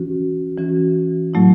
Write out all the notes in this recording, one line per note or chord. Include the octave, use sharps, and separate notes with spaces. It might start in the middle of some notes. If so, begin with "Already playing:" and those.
Already playing: E3 C#4 F#4
E3 C#4 F#4
A2 F#3 A3 E4